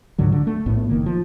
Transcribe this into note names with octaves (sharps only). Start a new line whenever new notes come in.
C#2 G#2 D3 F#3
D3
A3
A#1 A2 B3
F#1 D#3 A#3
F3